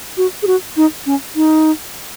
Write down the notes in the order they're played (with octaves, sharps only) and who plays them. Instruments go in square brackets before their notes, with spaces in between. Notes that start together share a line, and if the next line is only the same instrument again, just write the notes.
[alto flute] F#4
G#4
F#4
D#4
C#4
D#4